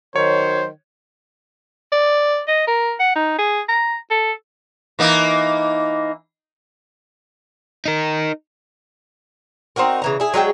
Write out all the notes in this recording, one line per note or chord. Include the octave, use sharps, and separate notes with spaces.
D#3 F#3 C5 C#5
D5
D#5
A#4
F#5
D#4
G#4
A#5
A4
E3 A#3 D#4
D#4 A#4
C4 D#4 F#4 A#4
C#3 E3 A#5
E4 G#4
F#3 G#3 G#4 G5